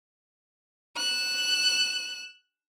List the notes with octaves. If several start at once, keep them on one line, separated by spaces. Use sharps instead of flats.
F#6 E7